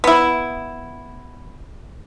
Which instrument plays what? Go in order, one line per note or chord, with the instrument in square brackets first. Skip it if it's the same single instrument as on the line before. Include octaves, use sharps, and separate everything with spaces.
[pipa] B3 E4